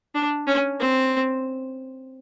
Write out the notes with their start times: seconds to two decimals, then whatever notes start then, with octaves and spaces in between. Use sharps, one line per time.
0.15 D4
0.47 C#4
0.80 C4